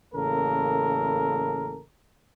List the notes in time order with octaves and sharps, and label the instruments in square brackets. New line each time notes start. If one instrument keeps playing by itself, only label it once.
[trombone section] A1 C#3 A#3 A4 A#4